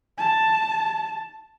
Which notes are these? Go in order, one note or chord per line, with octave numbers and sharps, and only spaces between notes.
A5